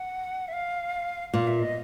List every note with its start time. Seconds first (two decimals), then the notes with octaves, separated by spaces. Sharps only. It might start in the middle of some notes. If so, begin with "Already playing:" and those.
Already playing: F#5
0.48 E5
0.53 F5
1.34 A#2 F5
1.47 E5
1.60 D#5